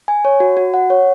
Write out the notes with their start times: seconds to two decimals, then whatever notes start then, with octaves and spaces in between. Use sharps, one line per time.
0.08 G#5
0.25 C#5
0.40 F#4
0.57 F#4
0.74 F#5
0.90 C#5